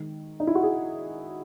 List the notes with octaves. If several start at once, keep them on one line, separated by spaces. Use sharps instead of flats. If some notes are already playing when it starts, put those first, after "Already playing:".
Already playing: D#3 G#3
D#4
E4
F#4
G#4